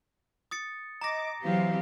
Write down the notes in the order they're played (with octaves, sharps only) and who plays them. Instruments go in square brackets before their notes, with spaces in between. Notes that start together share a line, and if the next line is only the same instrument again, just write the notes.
[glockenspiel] D#6 A6 C#7
[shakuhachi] D#5 [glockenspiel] A#5 A#6 [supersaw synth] D6
[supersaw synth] E3 [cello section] F#3 C4 G4 [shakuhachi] F5